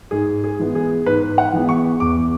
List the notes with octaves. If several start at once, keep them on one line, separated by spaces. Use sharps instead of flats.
G#2 G#4
G#4
E3 G#3 B3
G#4
G#2 B4
F#5
E3 G#3 B3
C#6
E2 D6